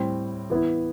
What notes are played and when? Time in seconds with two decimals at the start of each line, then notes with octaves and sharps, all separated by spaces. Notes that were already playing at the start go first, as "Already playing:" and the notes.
Already playing: A2 G3 C4
0.50 E3 B3 E4